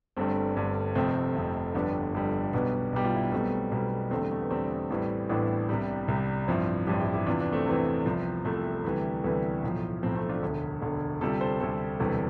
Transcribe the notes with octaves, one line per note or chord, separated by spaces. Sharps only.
G1 G2 D3 G3 A3 C4
G1 G2 D3 G3
F1 F2 C3 A3 C4
F1 F2 C3
G1 F2 D3 G3 B3 D4
G1 F2 D3 G3
B1 B2 G3 B3 D4
B1 B2 G3 G4
F4
E4
D4
B1 B2 G3 A3 C4
B1 B2 G3
E2 D3 G3 A3 C4
A3 C4
A3
B3
E2 D3 G3 A3 C4
A1 A2 E3 G3
A1 A2 E3 G3 B3 D4
C2 C3 G3
C2 C3 G3
A1 G2 F3 C4 E4
A1 G2 F3 E4 G4
E4 G4
E4 G4
E2 C3 E3 D4 F4
B3 D4
A3 C4
E2 C3 E3 B3
C2 C3 F3
C2 C3 F3 A3
D2 C3 E3 G3
D2 C3 E3 G3 B3
B1 A2 F3
B1 A2 F3 A3 C4
A3 C4
D4 F4
E1 D2 D3
E1 D2 D3
D2 C3 G3 F4 A4
A4 C5
D2 C3 G3 A4 C5
E1 D2 C3 E3 G3